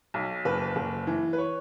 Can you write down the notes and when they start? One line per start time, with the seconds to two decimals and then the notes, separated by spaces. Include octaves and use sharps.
0.14 B1
0.45 F#1 B4
0.76 F#1
1.07 E3
1.33 B4
1.38 C#5